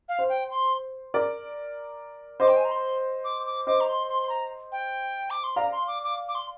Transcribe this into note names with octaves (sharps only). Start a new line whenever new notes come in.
F5
C5
G5
C6
A#4 D5
C5 D#5 D6
G5
G#5
A#5
C6
D6
D6
C5 D#5 D6
A#5
C6
C6
C6
A#5
G5
D6
C6
D5 F5 A#5
C6
D6
D6
D6
C6